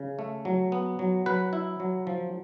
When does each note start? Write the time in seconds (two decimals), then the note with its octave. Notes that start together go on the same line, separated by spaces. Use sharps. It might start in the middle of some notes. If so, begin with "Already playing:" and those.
Already playing: C#3
0.19 A3
0.45 F#3
0.72 B3
0.99 F#3
1.26 F#3 B4
1.53 E4
1.80 F#3
2.07 F3